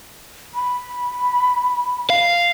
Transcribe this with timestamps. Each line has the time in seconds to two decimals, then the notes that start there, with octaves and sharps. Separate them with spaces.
0.54 B5
2.10 F5